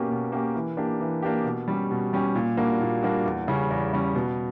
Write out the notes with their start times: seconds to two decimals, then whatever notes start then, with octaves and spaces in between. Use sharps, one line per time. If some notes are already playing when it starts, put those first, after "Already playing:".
Already playing: B2 A#3 C#4 G4
0.10 B2
0.32 A#3 C#4 G4
0.55 E3
0.77 A#3 D4 G4
1.01 E3
1.22 A#3 D4 G4
1.45 B2
1.68 G3 C#4 G4
1.91 B2
2.13 G3 C#4 G4
2.35 A#2
2.57 G3 A#3 D4 F#4
2.81 A#2
3.03 G3 A#3 D4 F#4
3.25 E2
3.48 C#3 G3 C#4
3.70 E2
3.93 C#3 G3 C#4
4.15 B2